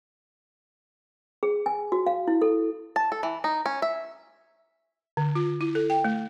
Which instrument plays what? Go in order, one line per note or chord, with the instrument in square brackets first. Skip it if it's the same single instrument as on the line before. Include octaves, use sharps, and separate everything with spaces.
[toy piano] G#4
G#5
F#4
F5
E4
A4
[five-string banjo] A5
A4
E3
D#4
C#4
E5
[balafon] D3
F4
E4
A4
G5
A3